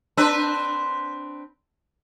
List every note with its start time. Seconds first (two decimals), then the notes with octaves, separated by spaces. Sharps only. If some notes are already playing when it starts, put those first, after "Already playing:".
0.17 C4 D4 B4 A5 A#5 E6